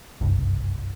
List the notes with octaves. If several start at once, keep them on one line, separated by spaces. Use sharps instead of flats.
F#1 C2 G2